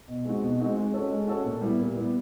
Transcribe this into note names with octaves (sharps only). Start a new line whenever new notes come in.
B2
G#3 C4 D#4 F#4
B2
G#3 C4 D#4 F#4
G#3
C#4 F#4 A4 C#5
G#3
C#4 F#4 A4 C#5
A#2
G3 B3 E4
A#2
G3 B3 E4